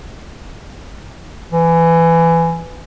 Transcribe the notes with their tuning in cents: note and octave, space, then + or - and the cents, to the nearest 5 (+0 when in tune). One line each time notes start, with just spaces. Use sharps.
E3 +20